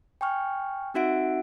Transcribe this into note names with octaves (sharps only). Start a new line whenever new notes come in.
G5 G#5 C#6 F6
C4 D#4 F#4 E5 F#5 D7